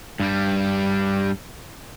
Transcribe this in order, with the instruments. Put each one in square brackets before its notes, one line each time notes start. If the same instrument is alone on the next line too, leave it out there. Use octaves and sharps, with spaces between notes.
[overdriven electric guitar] G2 G3